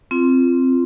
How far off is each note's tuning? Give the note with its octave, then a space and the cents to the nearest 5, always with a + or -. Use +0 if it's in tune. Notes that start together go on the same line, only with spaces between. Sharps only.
C4 +0 F4 -20 C6 +5